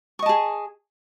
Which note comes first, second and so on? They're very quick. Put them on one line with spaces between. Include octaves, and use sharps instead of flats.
C#6 D#5 A5 G#4